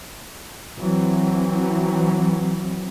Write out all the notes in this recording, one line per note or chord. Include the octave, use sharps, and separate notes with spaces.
E3 F#3 C4